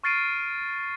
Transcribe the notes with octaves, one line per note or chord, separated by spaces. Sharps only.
C#6 F6 A6 C7 D7 D#7